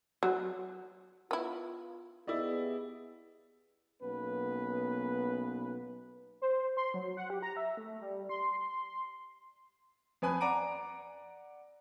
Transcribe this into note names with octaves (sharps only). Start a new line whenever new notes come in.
F#3
B3 E4 F4
B3 E4 G4 G#4 D5 D#5
B1 A#3 B3 C#4 B4
C5
C6
F#3
F#5
G4
A#5
E5
A3
G3
C6
F2 B4 G#5 B5
D5 F#5 A#5 D6 D7 D#7